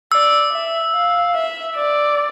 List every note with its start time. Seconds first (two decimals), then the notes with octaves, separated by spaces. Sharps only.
0.12 D5 E6
0.53 E5
0.94 F5
1.35 E5
1.76 D5